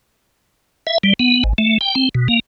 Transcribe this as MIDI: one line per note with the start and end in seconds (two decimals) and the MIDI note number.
0.87 0.98 76
1.03 1.13 55
1.19 1.43 59
1.44 1.53 32
1.58 1.78 57
1.81 1.95 79
1.95 2.09 60
2.15 2.28 47
2.28 2.40 58